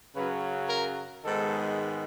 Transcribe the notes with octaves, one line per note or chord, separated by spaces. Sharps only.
F#2 C#3 F#3 B4
A#4
G#2 D#3 G#3 B3 A4